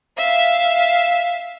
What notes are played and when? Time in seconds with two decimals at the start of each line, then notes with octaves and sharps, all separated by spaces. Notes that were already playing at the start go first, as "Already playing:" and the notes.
0.18 E5 F5